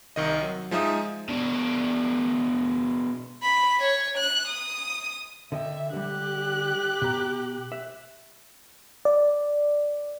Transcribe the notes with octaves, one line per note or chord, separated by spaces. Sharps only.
C2 D#3 D#5
F#3
F3 G#3 D#4 E5 D#6
B2 D4
B5
C#5
F#6
D#6
D3 D#5 E5 G5
D3 G3 G4 F#6
B2 A#5
E5
D5